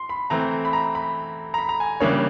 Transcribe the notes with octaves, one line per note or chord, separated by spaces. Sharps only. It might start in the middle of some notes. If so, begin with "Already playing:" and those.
Already playing: C6
B5
E3 A3 C4 A#5
B5
A#5
B5
A#5
B5
A#5
G#5
C#3 E3 G3 A#3 D4 C#5